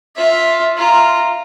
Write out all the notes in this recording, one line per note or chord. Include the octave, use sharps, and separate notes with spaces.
F4 E5
F4 A#5